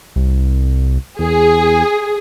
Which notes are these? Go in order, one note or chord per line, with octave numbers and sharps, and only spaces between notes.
C2
E2 G#4